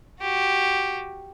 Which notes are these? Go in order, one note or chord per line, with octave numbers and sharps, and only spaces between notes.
F#4 G4